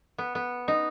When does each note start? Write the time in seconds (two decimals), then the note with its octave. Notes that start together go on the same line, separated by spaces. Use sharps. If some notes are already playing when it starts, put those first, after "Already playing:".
0.18 B3
0.35 B3
0.68 D#4